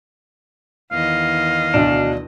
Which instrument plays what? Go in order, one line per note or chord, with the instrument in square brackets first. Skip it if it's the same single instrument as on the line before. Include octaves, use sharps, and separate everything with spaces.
[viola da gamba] E2 D#3 D#5 [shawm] F5
[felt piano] D2 B2 [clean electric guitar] D4